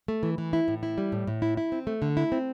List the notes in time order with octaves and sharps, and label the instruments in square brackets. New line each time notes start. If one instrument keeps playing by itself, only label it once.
[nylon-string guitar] A3
E3
E3
E4
A2
E4
G3
A2
A2
E4
E4
C4
A3
D3
E4
C4